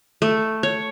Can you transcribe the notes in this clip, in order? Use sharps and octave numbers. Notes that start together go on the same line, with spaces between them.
A3
C#5